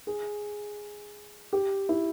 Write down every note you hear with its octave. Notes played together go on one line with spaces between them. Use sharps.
G#4
G4
E4